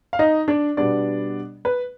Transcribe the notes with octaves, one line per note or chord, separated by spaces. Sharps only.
F5
D#4 D#5
D4 D5
B2 G3 B3 D4 D5
B4